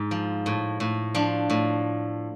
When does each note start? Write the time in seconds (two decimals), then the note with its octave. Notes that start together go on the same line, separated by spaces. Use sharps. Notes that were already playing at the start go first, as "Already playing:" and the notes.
Already playing: G#2
0.11 F3
0.46 A2
0.80 A2
1.15 F3 D4
1.50 A2